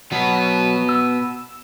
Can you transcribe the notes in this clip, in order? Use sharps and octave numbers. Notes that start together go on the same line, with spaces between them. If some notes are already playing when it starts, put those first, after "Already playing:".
B2 F#3 B3
E6